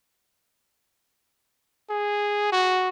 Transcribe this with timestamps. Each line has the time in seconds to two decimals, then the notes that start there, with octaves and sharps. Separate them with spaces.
1.90 G#4
2.52 F#4